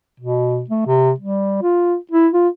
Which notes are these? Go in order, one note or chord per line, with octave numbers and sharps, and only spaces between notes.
B2
A3
C3
G3
F4
E4
F4